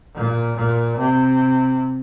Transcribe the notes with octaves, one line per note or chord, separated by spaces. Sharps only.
A#2
A#2
C3